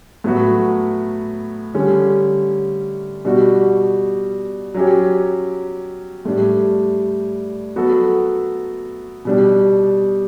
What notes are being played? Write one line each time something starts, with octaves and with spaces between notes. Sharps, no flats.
A2 F#3 B3 F#4
D3 G3 C#4
B2 G3 D4 F#4
F#3 C#4 G4
A2 G3 D4
F#3 B3 F#4 A4
B2 G3 D4